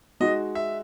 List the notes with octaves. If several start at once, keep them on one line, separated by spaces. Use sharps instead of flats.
G#3 D#4 F#4 D#5
E5